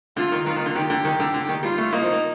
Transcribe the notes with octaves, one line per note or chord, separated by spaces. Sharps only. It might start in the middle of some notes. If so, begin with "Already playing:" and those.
D3 F4
D#3
D#3 F4
D#3
D3
D#3 G4
D3
D#3
D3
D3
D#3
G3 F4
A3
A#3 D#4
F3
A#3